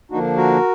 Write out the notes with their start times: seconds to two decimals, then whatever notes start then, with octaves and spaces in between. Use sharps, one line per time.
0.11 D3 F3 A#3 D4 D#4 F#4
0.36 F#4 A#4